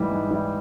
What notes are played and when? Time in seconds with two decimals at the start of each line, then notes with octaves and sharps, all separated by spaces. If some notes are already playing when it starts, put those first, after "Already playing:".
Already playing: G#2 E3 G3
0.12 G#2
0.31 E3 G3